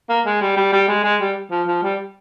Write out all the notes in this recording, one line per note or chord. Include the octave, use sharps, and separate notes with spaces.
A#3
G#3
G3
G3
G3
G#3
G#3
G3
F3
F3
G3